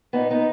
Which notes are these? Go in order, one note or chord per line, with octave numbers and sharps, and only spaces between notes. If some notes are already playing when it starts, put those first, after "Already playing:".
A#2 B3 D#4
B3 D#4